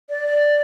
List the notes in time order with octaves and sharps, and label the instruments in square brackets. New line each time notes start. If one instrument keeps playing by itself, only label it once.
[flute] D5